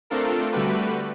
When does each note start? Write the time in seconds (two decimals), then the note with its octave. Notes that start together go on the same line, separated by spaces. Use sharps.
0.10 A3 C4 D4 F4 A4 A#4
0.53 D3 G3 A3 F#4 G4 B4